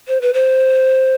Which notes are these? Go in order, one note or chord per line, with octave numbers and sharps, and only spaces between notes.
C5
B4
C5